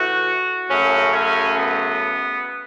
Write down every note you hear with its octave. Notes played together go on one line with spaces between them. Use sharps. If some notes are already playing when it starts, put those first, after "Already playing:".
Already playing: A2 E3 A3 F#4
F#2 C#3 A3 C#4
C#4
B3